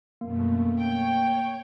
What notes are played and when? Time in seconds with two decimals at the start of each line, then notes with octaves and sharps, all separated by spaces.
0.21 F#2 B2 A3 A#3
0.79 C#5 G5